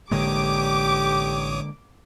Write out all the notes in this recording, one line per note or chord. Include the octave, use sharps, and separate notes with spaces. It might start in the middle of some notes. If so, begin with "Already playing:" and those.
A1 D3 G#3 A#3 G4 C#5 D6 D#6